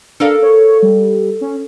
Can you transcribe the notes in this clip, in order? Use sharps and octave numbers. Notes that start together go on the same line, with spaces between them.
D4 A4 A#4 F5
C#5
G3
C#4